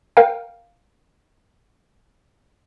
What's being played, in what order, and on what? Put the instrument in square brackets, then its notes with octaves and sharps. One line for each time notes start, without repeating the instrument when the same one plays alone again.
[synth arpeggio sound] A#4 F5 G5